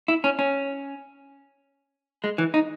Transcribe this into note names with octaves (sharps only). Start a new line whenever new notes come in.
E4
C#4
C#4
G#3
E3
D#4